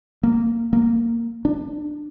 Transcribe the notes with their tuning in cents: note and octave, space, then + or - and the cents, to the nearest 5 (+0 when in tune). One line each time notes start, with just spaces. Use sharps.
A#3 -10
A#3 -10
D4 +25